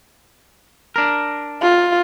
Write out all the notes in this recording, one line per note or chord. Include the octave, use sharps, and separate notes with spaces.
D4 A#4
F4